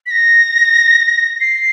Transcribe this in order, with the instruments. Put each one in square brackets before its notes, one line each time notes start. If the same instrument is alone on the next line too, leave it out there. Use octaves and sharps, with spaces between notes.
[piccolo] B6
A#6
C7